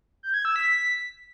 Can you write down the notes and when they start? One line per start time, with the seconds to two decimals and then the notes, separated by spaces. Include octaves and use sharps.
0.23 G6
0.34 G#6
0.45 E6
0.56 B6